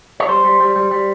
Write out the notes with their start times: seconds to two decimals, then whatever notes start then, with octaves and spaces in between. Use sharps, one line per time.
0.20 C#5
0.28 G3 C5
0.44 G3
0.60 G3
0.76 G3
0.91 G3